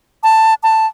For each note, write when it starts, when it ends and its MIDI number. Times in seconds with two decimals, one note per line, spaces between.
0.23 0.54 81
0.63 0.86 81